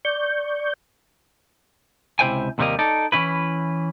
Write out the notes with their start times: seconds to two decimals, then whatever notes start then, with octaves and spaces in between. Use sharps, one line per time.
0.05 D5 C#6 G6
2.19 C#2 C3 E4 C5 G5 G#5
2.58 D#2 C3 F#3 G3 A#3 D#5
2.79 D#4 A4 D5
3.12 E3 C#4 E4 B4